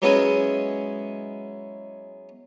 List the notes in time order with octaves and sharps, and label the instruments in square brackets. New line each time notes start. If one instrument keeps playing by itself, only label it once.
[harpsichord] F#3 G#3 B3 C#4 E4 G#4